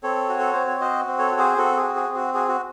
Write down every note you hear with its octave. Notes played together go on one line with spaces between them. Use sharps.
C4 A4 C#5
F#4
A4
C4 C5
C#5
F#4 C5 D#5
C4
A4 C#5
F#4
G#4 C5
C4 F#4 A4
G#4
F#4
G#4
C4
F#4
F#4 G#4
F#4